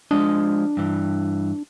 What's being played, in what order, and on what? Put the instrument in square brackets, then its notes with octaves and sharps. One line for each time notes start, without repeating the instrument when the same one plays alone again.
[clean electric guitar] F3 G#3 D#5 [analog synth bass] D4
[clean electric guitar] G2 E3